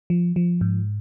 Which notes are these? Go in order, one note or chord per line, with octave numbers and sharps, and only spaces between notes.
F3
F3
G#2